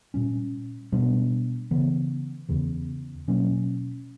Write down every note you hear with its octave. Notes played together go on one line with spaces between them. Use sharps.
A#2 G3 C#4
B2 G3 B3 D4
C#3 E3 B3
E2 C#3 E3
B2 F#3 A#3 C#4